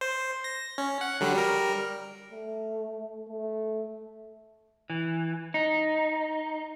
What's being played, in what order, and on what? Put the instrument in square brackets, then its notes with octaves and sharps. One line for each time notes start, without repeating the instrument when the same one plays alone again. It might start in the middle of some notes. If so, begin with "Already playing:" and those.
[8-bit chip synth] C5
A#6
C#4
F#5
D3 F#3 G3
G3 A#4
[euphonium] A3
A3
[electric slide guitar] E3
D#4